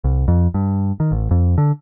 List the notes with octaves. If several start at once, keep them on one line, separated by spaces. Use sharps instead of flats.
C2
F2
G2
D#3
A1
F2
D3